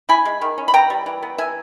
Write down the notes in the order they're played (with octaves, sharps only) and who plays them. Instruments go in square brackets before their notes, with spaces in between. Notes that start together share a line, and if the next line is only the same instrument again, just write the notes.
[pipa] E4 G#5 B5
G#3
D#3
C#4
B5
E3 G5 A#5
G3
E3
B3
E3 E5 G#5